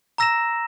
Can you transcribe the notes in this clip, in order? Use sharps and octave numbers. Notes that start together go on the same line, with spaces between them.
A#5 E6 A#6 E7